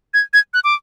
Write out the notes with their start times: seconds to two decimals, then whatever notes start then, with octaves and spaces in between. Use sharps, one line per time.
0.14 G#6
0.33 G#6
0.54 F#6
0.64 D6